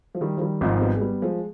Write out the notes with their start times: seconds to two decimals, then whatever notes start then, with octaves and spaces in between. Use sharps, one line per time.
0.15 F3
0.21 D#3 G3
0.37 F3
0.41 D#3 G3
0.61 G#1 G#2 F3
0.70 C4
0.81 G3 B3
0.96 G#3
1.01 G3 B3
1.22 F3 G#3